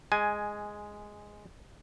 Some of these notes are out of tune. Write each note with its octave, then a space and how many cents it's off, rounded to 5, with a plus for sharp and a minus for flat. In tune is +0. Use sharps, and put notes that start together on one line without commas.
G#3 +0 G#5 +10